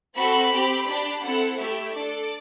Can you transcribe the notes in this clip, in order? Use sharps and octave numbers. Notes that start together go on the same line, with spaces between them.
C4 F#4 A4 B5
C4 G4
D4 G4 B5
C4 E4 A4 F#5
A3 E4 G4 E5
D4 A4 D5